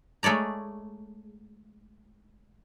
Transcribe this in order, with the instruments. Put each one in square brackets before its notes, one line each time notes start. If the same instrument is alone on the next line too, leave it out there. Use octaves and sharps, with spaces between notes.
[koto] G#3 A3 C#5 D5 A#5